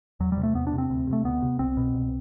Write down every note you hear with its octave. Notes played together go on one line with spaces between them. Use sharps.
E2 F#3
G3
C3
A3
E2 B3
D4
C3
C4
D2
C3
A3
D2 B3
C3
C2 C4
B2
C2